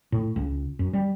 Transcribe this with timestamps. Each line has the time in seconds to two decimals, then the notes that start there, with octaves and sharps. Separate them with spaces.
0.12 A2
0.36 C#2
0.79 F#2
0.93 G3